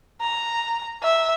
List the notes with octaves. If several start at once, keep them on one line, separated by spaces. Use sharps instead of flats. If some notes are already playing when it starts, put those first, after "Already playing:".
A#5
E5